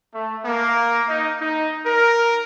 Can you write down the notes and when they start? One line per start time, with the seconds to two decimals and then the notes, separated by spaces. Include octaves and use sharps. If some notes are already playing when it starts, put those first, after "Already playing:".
0.13 A3
0.44 A#3
1.06 D#4
1.40 D#4
1.84 A#4